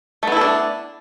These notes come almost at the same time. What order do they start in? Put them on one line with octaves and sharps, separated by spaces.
A3 B3 E4 A4 D4